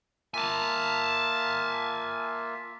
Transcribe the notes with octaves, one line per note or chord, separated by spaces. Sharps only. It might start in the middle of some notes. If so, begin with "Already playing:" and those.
A#3 F4 E5 G#5 A5